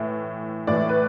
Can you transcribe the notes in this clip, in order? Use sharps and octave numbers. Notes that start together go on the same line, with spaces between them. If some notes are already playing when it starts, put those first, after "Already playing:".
Already playing: A2 E3
A2 E3 A3 D5
B4